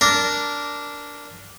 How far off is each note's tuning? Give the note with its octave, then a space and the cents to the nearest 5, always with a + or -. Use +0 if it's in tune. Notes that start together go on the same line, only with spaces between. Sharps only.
D4 -10 A#4 -5